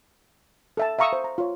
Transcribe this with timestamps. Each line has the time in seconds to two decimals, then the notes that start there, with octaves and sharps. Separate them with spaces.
0.77 A4 E5 A5
0.99 E5 F5 A#5 C#6 D#6 E6
1.13 C5
1.24 A#5
1.38 F4 C#5